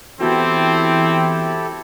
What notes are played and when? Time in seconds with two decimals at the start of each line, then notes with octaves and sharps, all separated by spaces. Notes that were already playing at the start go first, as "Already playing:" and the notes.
0.21 E3 B3 C4 E4 F#4 G4 A4